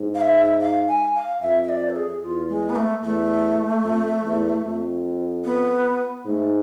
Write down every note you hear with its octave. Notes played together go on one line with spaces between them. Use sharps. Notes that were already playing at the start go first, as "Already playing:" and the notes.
Already playing: G#2
F5
E5
F5
G#5
F5
F2 E5
E5
D5
A4
G#4
E2 F4
G#3
B3
A3
E2 A3
F2
E2
F2
B3
G#2 A3